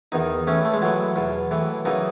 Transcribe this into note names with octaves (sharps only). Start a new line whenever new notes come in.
E2 D#3 D#4
A2 E3 C#4
A3
G#3
A2 E3 F#3
E2 B2
A2 E3
F#2 C#3 E3 D#4